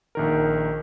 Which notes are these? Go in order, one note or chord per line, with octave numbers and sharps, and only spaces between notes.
A#1 D#3 A#4